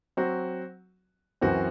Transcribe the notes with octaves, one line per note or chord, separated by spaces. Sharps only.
F#3 C4 F#4
F#2 E3 C4 F#4